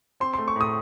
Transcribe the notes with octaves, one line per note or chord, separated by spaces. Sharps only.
C4 C6
A3 C6
C#6
A2 D#6